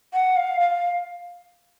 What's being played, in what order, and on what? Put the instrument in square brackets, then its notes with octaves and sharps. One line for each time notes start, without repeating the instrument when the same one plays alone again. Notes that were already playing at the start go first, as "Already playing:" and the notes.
[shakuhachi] F#5
F5
F5